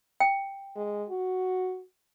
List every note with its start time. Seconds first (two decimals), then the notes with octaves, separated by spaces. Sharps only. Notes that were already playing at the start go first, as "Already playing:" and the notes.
0.20 G5
0.76 G#3
1.09 F#4